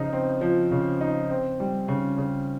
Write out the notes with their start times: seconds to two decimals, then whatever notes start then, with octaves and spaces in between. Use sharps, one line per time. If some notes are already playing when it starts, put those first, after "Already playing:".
Already playing: C#3 F3 D#4
0.13 C4
0.41 F3
0.71 C#3
1.01 D#4
1.30 C4
1.60 G3
1.88 C#3
2.18 C#3